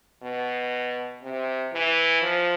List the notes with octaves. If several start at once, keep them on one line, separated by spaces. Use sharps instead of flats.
B2
C3
E3
F3